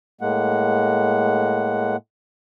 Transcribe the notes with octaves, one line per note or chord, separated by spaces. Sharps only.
A2 G#3 A#3 F#5